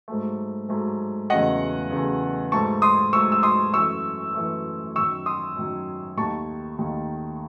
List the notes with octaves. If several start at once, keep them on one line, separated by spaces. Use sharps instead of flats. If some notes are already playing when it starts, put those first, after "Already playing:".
G#2 F#3 A3
G#2 F#3 A3
E2 C#3 F#3 A3 D#5 F#5
E2 C#3 F#3 A3
G#2 F#3 A3 A5 C#6
C6 D#6
G#2 F#3 A3 C#6 E6
E6
C6 D#6
F#2 E3 A3 C#6 E6
F#2 E3 A3
F#2 D#3 F#3 C#6 E6
C6 D#6
F#2 D#3 F#3
D#2 D#3 A3 A5 C#6
D#2 D#3 A3